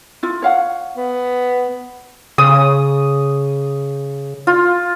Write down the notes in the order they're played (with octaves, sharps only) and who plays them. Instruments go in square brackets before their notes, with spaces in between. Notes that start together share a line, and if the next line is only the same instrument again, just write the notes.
[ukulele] E4 F4
C#5 F5 F#5
[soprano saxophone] B3
[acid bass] C#3 [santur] D#6
[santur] F4